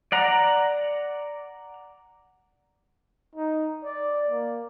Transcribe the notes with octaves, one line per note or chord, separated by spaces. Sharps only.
D5 F#5 A#5
D#4
D5
A#3